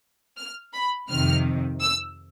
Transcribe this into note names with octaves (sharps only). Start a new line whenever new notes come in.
F6
B5
F2 C3 D#3 F6
E6